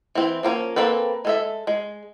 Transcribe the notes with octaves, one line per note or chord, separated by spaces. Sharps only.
E3 C4
F3 A#3 C4 C#4
A#3 C4 A4 B4
G#3 A4 E5
G#3